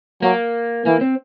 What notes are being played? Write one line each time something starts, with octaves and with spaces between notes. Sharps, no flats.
F#3 A#3
E3 A#3
C4